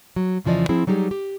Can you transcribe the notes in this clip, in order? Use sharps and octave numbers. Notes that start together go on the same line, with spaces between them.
F#3
F2 C#3 E3 F3 D5 D#5
F3 C4 E4 G#4
F#3 G3 D#4 G4 G#4
G4